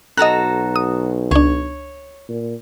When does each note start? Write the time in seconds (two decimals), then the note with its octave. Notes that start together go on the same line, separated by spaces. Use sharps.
0.17 B1 F#4 A4 D#5 A#5 F#6
0.76 D#6
1.31 C#2 D4 C#5
2.29 A#2